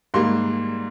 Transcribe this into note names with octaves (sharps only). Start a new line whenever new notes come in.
G#2 G3 A#3 C6